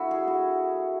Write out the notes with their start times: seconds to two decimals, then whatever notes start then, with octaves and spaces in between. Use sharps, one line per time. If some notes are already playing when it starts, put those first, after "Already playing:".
Already playing: D3 A3 E4 F#4
0.11 G#4
0.28 F#4